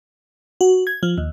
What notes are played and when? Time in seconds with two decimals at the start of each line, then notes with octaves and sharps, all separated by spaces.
0.61 F#4
0.87 G#6
1.03 F3
1.18 D#2